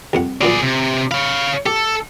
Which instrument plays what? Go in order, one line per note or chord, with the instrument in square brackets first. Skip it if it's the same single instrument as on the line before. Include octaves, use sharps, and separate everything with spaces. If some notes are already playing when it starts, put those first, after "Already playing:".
[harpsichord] C2 F2 F#5
[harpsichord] A#2 F#3 C#4 [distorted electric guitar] G#4 D5
[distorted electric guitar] C3
[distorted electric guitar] C#5 F5 [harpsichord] B5
[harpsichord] G4 [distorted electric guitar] A4